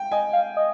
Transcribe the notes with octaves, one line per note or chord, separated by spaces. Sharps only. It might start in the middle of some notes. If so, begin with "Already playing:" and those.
Already playing: G5
D#5 G#5
F5
D#5